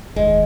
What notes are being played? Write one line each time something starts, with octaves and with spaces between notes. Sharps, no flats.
F1 D#2 D#3 G#3